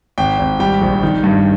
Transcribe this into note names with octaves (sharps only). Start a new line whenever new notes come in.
G#1 G5
G#1
G3 G5
A#1
D#3
G2